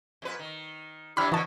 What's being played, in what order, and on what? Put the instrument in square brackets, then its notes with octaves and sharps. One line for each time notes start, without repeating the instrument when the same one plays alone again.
[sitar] F2 A#2 B4
D#3
[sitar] G2 E3 F3 [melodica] D4 E4 G4 [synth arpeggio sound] B5 F6
[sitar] F2 D3 [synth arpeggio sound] E3 A5 [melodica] F#4 D#5